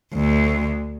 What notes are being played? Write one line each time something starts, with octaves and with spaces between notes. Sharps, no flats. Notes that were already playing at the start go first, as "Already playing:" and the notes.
D2